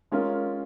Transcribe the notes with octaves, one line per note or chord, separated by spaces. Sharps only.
G#3 C#4 F4 A#4